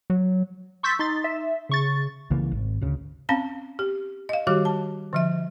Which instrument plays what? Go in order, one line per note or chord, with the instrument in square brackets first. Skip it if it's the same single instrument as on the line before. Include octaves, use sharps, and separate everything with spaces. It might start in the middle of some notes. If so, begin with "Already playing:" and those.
[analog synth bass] F#3
[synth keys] C6 C#6 E6 G6 A6 B6
D#4 C6 A6
E5
C#3 C#6 A6
[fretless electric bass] C2 C#3 E3 A#3
G#1
D2 C#3
[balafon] C4 C#4 F5 A5
G4
D#5 F5
D#3 G3 F#4 G4 D6
A5
D3 F3 E5